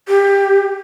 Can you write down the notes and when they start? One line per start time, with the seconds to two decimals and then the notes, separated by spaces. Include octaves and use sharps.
0.08 G4